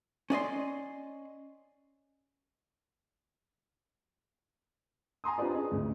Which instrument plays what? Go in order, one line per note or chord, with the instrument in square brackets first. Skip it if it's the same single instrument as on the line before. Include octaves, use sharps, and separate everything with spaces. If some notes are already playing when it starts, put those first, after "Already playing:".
[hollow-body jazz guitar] C#4 D5 D#5 C6
[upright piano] G#5 A#5 C6 D#6
D4 F4 G4 B4 C5 D5
C#4 G#4 D#5
D2 A2